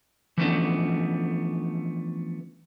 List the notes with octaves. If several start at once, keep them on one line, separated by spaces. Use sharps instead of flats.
E3 F3 A3 B3 C#4 D4